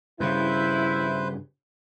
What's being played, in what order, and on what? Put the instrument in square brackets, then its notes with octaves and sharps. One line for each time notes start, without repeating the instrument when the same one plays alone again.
[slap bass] G2 C#3 [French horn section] E4 [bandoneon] B4 C5 G6